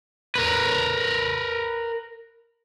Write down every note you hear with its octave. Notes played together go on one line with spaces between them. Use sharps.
A#4 B4